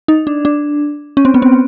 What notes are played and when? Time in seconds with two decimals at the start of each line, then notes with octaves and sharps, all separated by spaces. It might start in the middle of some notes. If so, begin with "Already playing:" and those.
0.08 D#4
0.27 D4
0.45 D4
1.17 C#4
1.25 C4
1.34 B3
1.42 C4